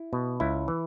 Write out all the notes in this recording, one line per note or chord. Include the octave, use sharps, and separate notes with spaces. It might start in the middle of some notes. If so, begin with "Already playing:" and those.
Already playing: E4
B2
C#2 E4
E3